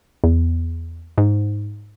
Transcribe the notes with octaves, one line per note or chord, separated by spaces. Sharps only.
E2
G#2